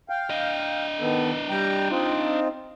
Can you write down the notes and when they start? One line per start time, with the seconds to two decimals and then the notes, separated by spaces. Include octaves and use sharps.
0.09 F5 G5
0.30 D4 D#5
1.00 D#3 B3 A4
1.50 G3 G5 A#5
1.90 C4 D#4 F4